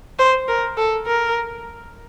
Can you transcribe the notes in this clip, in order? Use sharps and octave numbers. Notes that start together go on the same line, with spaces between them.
C5
A#4
A4
A#4